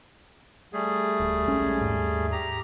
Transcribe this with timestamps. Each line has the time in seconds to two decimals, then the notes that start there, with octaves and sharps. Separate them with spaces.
0.73 G3 A3 G#4
1.20 D1
1.48 A#1 G#3 C#4
1.81 D#2 G#2
2.32 G4 A#5